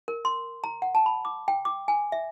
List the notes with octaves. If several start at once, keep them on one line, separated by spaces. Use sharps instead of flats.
A#4
C6
A#5
F#5
A5
B5
D6
G5
D6
G#5
E5